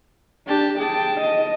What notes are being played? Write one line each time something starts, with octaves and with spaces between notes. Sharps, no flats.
D4 G4 A5
G#4 G5 A5
D#5